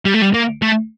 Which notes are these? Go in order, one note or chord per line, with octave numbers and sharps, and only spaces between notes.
G3
A3
G3
A#3
A3